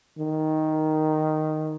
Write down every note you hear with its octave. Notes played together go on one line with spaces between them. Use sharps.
D#3